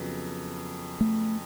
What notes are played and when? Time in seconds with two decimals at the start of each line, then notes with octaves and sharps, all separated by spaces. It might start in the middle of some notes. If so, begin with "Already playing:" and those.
Already playing: F2 C#3 F#3 B3
1.01 A3